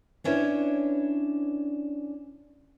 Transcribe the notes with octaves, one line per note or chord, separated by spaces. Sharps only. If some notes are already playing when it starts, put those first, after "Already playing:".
B3 C#4 D4 E4 B4 C#5